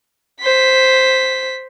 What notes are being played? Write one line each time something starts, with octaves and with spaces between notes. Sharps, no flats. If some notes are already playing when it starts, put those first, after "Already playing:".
C5 B6